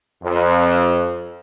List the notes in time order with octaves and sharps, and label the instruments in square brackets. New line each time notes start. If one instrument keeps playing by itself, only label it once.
[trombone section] F2